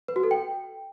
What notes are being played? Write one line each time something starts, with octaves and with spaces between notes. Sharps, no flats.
B4
F#4
A4
G5